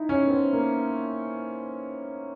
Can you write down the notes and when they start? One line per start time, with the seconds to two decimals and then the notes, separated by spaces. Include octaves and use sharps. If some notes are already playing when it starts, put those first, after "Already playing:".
Already playing: D#4 E4
0.09 C#4
0.27 B3
0.31 C4
0.53 A#3